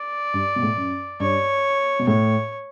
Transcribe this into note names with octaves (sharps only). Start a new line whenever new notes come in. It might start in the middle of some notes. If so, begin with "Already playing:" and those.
Already playing: D5
G2
B2
A2
F#2
G2 C#5
B2
A2 C#5